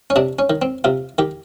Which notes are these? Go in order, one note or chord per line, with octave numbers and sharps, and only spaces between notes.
C#4
C3 D4
C#4
D#3
C4
C3 F4
D#3 G4